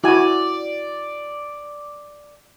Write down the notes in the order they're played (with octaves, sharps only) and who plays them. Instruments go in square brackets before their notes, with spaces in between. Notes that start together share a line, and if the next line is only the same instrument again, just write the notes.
[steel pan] E4 F#4 G#5 [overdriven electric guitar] D5